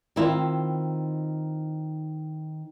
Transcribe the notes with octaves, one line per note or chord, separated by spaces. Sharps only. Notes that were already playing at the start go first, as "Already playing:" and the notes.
D#3 C4 E4 F4